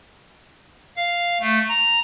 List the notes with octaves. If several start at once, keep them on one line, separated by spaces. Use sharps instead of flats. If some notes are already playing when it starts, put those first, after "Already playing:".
F5
A3
A#5